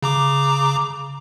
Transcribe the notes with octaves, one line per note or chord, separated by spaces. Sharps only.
C#3 A#5 D6